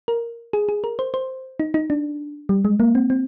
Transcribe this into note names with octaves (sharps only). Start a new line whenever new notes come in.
A#4
G#4
G#4
A#4
C5
C5
D#4
D#4
D4
G3
G#3
A#3
C4
C4